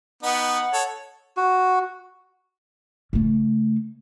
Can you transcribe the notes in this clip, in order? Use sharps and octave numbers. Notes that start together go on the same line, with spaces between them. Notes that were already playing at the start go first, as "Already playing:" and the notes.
B3 D#4 F#5
A4 C#5
F#4
C#3 A3